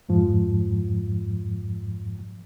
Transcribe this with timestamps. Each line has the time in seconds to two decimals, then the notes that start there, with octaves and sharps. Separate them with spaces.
0.09 F2 G#2 F3